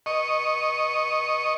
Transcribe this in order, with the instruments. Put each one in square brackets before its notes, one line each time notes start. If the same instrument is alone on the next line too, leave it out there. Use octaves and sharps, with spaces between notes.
[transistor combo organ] D#5 C#6